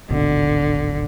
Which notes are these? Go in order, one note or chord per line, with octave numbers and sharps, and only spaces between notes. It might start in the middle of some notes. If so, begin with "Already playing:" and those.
D1 G#1 B2 D3